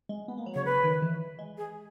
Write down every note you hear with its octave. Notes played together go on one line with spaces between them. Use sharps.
G#3
B3
A#3
F#3
C#3 C#5
C#3 B4
D#3
E3
G#3
G#4